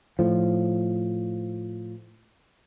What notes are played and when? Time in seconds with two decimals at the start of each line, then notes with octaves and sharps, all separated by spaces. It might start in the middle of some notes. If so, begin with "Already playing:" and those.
0.19 A2 F3